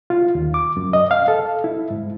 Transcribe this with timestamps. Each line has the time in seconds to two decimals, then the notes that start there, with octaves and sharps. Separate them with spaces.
0.10 F4
0.35 D#2
0.54 D6
0.77 F#2
0.93 D#5
1.11 F5
1.28 A4
1.64 E4
1.91 G#2